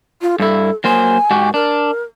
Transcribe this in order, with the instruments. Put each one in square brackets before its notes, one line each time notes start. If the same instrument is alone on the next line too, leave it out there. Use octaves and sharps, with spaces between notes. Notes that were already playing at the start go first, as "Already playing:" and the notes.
[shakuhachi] F4
[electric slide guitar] G2 E4 [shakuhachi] A4
[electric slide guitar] F#3 A#3 C5 [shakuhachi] G#5
[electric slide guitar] G#2 F#4 G4
[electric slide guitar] D4 [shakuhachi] A#4